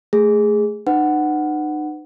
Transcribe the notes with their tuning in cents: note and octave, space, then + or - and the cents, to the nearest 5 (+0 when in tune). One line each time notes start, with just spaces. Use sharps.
A3 -5 G#4 -5
D#4 -40 B4 +40 F#5 +5